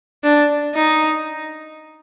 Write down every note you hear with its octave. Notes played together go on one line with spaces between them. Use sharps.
D4
D#4